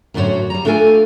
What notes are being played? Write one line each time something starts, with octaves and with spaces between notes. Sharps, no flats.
F#2 A2 D3 F#4 C5 C#5
G3 A#5
A3 D4 F4 A4 A#4 G#5